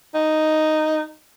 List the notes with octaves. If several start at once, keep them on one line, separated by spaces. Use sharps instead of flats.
D#4